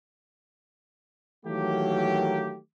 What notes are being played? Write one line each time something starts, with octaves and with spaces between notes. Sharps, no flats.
D#3 E3 F#3 A3 A#3 G4